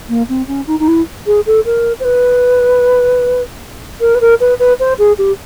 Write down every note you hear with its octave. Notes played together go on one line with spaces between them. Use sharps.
A#3
C4
C#4
D#4
D#4
E4
G#4
A4
A#4
C5
B4
A#4
B4
A#4
B4
B4
C5
G#4
G4